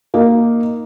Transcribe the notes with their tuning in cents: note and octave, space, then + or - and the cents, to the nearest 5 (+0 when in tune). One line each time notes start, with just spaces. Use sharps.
A#3 +0 D#4 +0